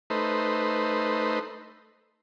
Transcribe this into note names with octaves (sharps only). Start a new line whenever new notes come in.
A3 D#4 B4 C5